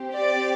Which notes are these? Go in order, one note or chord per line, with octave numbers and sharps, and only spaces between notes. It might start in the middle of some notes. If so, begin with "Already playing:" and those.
Already playing: C4 G4
D5